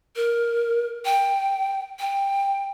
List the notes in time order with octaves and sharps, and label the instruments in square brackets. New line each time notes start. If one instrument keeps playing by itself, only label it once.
[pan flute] A#4
G5
G5